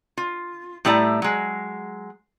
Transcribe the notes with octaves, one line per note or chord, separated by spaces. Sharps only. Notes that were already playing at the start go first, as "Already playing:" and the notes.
F4
A2 G3 A3 E4 D5 A#5
F#3 G#3